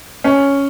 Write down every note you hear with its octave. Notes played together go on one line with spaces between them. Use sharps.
C#4